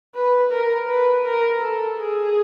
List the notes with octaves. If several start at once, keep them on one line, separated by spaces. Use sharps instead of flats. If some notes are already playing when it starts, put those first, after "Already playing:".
B4
A#4
B4
A#4
A4
G#4